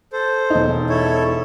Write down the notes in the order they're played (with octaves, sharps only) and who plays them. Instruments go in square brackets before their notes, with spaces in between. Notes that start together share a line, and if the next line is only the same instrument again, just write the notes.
[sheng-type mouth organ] A4 C5
[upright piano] E1 D#4
[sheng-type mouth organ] E4 A4 C#5